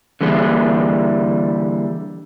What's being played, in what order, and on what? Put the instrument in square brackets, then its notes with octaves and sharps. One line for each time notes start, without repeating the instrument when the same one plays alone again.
[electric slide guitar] D3 E3 G3 A#3 G#4